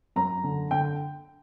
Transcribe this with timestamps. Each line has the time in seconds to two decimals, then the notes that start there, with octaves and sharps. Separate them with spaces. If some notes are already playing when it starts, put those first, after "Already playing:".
0.16 F#2 A#5
0.44 D3
0.71 D3 G5